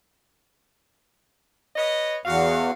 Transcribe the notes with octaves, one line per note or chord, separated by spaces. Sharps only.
B4 C#5 D#5
E2 F#4 F5